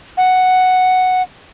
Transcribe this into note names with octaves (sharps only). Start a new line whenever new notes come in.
F#5